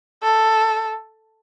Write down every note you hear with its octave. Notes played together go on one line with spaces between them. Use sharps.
A4